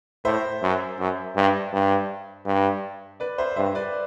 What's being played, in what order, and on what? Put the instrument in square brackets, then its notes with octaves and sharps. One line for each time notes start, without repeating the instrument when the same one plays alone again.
[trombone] A2 [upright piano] C5 E5
[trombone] F#2
F#2
G2
G2
G2
[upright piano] B4 D5
C5 E5
[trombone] G2 [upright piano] C5 E5
[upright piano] B4 D5